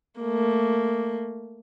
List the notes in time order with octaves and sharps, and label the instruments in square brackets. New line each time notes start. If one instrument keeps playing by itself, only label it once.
[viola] A3 A#3